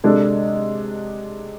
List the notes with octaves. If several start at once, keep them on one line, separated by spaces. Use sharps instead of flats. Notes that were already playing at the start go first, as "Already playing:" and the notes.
C3 G#3 D4 A4